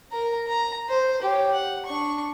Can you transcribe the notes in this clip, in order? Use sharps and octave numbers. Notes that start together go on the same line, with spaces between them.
A#4 A#5
A#5
C5
G4 C#5
F#5
D4 C#6